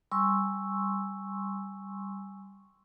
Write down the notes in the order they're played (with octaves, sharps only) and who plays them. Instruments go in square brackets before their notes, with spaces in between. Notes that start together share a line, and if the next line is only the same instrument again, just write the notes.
[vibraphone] G3 G#5 C6 C#6 E6